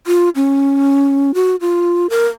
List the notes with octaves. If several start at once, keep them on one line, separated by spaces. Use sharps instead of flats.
F4
C#4
F#4
F4
A#4